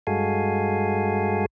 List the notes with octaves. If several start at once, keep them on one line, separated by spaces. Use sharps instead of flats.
G2 G#3 F#4 A4 F5 G#5